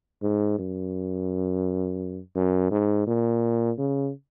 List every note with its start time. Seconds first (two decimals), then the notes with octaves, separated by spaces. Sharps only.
0.23 G#2
0.59 F#2
2.35 F#2
2.71 G#2
3.07 A#2
3.78 C#3